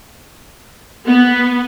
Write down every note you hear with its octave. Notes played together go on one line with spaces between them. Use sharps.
B3